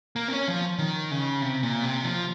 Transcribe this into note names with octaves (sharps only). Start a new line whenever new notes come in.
A#3
C4
C#4
F3
D#3
C#3
C3
A#2
C3
F3